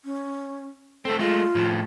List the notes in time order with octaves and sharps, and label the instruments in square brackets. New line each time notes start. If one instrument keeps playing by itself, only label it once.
[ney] C#4
[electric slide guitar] A3 C4 [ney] A4
[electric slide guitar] G#3 A3 [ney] F4
[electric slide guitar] A2 F3